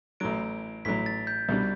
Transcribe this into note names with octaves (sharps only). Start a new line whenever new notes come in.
A1 A2 F#3 D7
A1 A2 F#3 B6
A6
G6
C2 B2 G3 D4